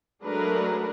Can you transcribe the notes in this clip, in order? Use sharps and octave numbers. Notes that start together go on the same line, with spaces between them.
F#3 G#3 A3 D4 A#4 B4